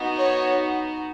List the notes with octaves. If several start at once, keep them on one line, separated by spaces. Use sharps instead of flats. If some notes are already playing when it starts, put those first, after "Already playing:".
Already playing: B3 D#4 F#4
C#5